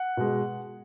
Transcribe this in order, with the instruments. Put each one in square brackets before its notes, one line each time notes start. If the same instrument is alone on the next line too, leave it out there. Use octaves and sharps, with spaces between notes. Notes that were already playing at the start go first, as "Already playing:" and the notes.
Already playing: [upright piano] F#5
B2 G#3